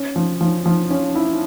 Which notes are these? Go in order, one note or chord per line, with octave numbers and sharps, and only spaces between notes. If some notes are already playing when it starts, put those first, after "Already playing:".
Already playing: C#4
F3
F3
F3
C#4
E4